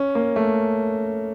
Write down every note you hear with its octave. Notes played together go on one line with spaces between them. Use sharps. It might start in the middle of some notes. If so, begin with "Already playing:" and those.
Already playing: C#4
A#3
A3